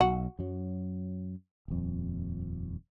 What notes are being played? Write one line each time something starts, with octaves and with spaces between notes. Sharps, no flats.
B1 F#4
F#2 F#3
D#1 F2